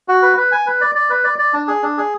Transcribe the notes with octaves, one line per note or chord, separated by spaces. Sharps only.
F#4
B4
B4
G#5
B4
D5
D5
B4
D5
D5
D4
G#4
D4
G#4